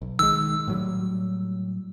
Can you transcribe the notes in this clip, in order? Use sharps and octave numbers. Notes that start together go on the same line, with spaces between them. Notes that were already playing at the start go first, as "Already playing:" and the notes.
B1
D#3 G#3 E6
A2 F#3 G3